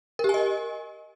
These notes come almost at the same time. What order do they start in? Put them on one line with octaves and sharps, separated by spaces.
A#4 G4 G#5 D#5